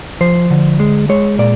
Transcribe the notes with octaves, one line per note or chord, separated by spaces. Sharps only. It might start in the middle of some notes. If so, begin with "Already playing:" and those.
F3 C5
D3
G#3
G#3 C#5
A#2 D5